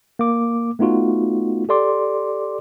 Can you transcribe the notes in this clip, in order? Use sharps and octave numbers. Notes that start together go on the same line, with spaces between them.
A#3 D6
A3 B3 D#4 F4 F#4
G4 A4 D5 C6 D6